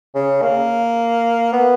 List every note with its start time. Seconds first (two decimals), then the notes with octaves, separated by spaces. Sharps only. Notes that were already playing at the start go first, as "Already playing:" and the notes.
0.15 C#3
0.42 A#3
1.53 B3